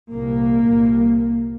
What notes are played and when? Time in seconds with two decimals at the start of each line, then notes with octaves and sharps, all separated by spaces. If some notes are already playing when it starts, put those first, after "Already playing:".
0.11 C2 A#2 A#3
0.68 C2 A#2